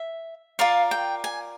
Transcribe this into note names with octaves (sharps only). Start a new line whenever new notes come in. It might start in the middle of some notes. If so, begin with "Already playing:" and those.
Already playing: E5
F4 A#4 D5 F5
G5
G#5